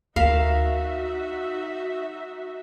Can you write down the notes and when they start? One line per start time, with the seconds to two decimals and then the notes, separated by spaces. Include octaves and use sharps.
0.16 D2 D#4 F#4 A#4 E5 F5 B6 E7